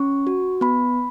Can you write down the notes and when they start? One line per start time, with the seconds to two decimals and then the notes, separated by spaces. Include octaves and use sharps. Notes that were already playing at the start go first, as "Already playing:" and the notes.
Already playing: C#4 C#6
0.27 F#4
0.61 B3 B5